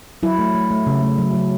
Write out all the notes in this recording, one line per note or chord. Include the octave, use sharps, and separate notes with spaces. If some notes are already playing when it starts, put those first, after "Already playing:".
F#3 E4
A3
A3
A3
C#3
A3
F#3
F#3